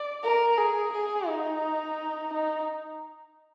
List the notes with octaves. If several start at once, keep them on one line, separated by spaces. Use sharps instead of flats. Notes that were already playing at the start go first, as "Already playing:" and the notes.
Already playing: D5
A#4
G#4
G#4
D#4
D#4